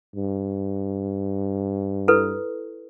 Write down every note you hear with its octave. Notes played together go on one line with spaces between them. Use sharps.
G2
E4 A4 B4